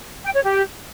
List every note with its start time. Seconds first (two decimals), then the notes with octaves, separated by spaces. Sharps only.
0.24 G5
0.33 C#5
0.43 G4